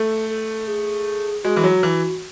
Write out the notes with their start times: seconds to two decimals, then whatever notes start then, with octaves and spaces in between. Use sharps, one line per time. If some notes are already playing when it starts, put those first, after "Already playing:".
Already playing: A3 A4
0.30 A4
0.67 G#4
1.44 G#3 F#4
1.56 E3
1.63 F#3
1.83 E3